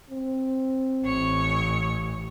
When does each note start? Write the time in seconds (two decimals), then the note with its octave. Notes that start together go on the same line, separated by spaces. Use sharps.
0.10 C4
1.04 A1 C#5